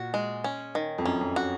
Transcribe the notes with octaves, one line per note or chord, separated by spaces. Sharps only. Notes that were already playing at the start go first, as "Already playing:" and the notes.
Already playing: A#2 F#4
G#3
C#4
D#3
F2
F#2 C#4
F2
F#4